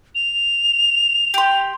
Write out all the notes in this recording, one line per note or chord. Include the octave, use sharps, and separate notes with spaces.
F7
G4 C6